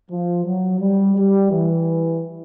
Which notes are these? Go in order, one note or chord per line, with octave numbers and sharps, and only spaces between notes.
F3
F#3
G3
G3
E3